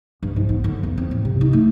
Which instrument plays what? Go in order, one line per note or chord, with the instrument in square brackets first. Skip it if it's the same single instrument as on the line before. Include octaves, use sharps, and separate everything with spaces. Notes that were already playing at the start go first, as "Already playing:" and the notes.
[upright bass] G2
G#2
B3
D3
E2
C4
A2
C3
D#4
A3